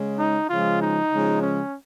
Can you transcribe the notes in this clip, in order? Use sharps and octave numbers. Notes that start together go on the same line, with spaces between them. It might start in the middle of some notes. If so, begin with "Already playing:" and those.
Already playing: C#3 G#3
D#4
C#3 F3 G#3 F4
D#4
C#3 F3 G#3
C#4